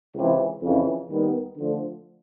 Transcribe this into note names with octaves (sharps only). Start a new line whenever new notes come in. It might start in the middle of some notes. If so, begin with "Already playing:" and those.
C#2 C3 E3
F2 C#3 E3
D#2 D#3 G3 B3
D3 F3 A3